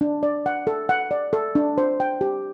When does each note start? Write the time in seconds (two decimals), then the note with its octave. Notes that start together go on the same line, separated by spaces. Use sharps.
0.01 D4
0.23 D5
0.46 F#5
0.67 A4
0.89 F#5
1.11 D5
1.33 A4
1.55 D4
1.78 C5
2.00 G5
2.21 G4